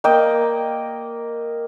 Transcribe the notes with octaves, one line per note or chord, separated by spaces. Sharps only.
A#3 D#5 G5